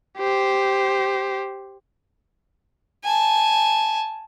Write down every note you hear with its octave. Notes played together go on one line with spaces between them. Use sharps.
G4 C5
G#5 A5